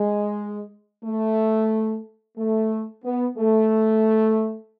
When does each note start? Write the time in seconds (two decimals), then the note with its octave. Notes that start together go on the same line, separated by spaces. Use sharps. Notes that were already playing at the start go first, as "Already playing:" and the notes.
Already playing: G#3
1.04 A3
2.38 A3
3.05 B3
3.38 A3